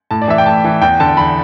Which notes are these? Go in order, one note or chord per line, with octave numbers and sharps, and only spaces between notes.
A2 A5
D5
E3 E5
G5
A2 A5
E3
E2 G5
D3 A5
E2 B5